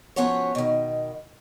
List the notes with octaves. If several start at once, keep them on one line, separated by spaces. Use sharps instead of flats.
F3 B3 C#4 F#4 C#5
B2 D#3